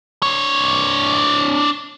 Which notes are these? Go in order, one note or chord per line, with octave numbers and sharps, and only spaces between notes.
D4 C#5